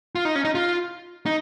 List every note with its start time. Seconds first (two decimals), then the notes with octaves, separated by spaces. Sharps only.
0.15 F4
0.25 D#4
0.35 C#4
0.45 D#4
0.55 F4
1.26 D#4